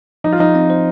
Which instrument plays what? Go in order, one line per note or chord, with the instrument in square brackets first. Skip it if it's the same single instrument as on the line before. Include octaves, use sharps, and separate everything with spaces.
[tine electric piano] F3 [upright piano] D#4
[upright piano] F4
[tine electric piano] F3 [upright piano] D#4
[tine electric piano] C4
C5